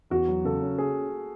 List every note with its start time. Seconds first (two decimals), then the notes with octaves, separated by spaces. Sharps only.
0.10 E2 F#4
0.28 F#3
0.44 C#3 A4
0.62 C#4
0.78 G#4